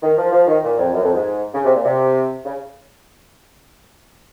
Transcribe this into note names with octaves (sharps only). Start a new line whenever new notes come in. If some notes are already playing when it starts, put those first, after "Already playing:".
D#3
F3
F3
D#3
A#2
F2
F#2
F2
G#2
C#3
C3
A#2
C3
C#3